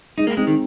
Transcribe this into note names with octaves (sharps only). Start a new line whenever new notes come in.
G#3 D#4
A#3
G#3 C4 D#4
D#3